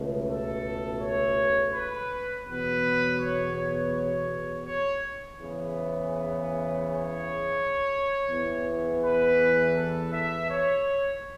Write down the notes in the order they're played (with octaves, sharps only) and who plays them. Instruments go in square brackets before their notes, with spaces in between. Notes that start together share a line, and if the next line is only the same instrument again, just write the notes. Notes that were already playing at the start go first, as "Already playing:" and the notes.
Already playing: [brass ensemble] C#2 B2 A3
A4
C#5
B4
E2 B2 F#3 B3 B4
C#5
C#5
C#5
C#5
E2 C#3 E3 B3
C#5
E2 E3 B3
B4
A4
E5
C#5